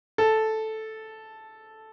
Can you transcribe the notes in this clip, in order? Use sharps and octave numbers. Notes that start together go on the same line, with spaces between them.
A4